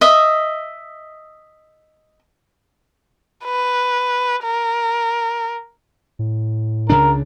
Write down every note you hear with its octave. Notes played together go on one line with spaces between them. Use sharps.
D#5 E5
B4
A#4
A2
C#2 C#3 D4 A#4